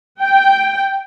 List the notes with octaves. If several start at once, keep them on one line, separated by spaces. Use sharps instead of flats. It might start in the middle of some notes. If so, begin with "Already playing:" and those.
G5